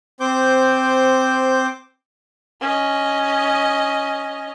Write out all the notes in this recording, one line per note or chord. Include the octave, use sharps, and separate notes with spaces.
C4 C5 D6 G6
C#4 D#5